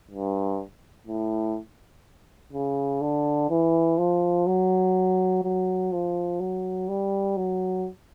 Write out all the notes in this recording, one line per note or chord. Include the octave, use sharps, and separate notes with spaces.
G2
A2
C#3
D3
E3
F3
F#3
F#3
F3
F#3
G3
F#3